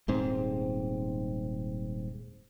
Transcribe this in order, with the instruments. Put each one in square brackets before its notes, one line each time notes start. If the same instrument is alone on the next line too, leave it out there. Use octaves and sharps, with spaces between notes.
[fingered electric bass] D#1 G#2 C4